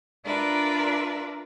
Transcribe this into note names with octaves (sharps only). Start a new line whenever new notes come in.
D4 F4 A#4 B4 D5 E5